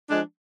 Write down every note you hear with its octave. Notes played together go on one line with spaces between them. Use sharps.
F3 G#3 D4